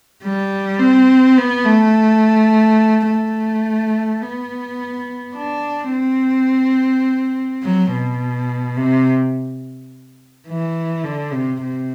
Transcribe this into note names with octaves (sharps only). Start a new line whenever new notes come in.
G3
C4
B3
A3
A3
B3
D4
C4
F#3
B2
C3
E3
D3
C3
C3